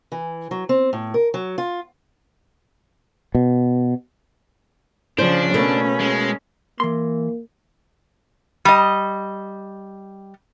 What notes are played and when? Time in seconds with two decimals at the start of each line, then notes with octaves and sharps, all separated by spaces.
0.12 E3
0.51 F#3
0.69 C4
0.93 A2
1.14 A#4
1.34 F#3
1.58 F4
3.35 B2
5.18 C#3 F3 D4 C5
5.54 B2 A3 A#3 C#4
6.00 G#3
6.80 E3 A#3 C6
8.65 G3 D#5